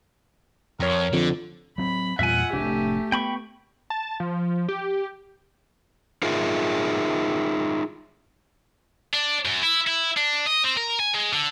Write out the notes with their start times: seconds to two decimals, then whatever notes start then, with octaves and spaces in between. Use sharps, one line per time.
0.80 F2 A#4 C#5
1.13 F2 D3
1.78 F#3 C4 B5
2.19 E2 A#2 G3 F4 E5 F#5 G#5
2.53 F1 A2 A3 D4 G4
3.12 B3 G5 B5 C#6
3.90 A5
4.20 F3
4.69 G4
6.23 D#4 F4 G#4 A#4 E5
9.14 D4
9.45 F#2
9.63 E4
9.87 E4
10.17 D4
10.46 D#5
10.64 C4
10.77 A#4
11.00 G#5
11.14 G#3
11.33 D3